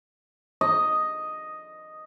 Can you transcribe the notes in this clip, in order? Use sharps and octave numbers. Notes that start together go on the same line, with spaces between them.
D#5